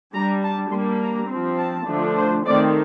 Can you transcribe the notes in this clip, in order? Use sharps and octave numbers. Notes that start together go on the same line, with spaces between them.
G3 D4 A#5
A5
G3 A#3 D4 C6
A#5
F3 C4
A5
D3 F3 A3 D4
C5
D#3 A3 C4 D5